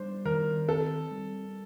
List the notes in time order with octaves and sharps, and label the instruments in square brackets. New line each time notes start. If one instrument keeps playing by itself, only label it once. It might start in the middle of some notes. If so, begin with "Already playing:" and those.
Already playing: [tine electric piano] G3 [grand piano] D4 C5
[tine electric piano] D#3 [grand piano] A#4
[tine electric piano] C4 [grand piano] A4
[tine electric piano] G3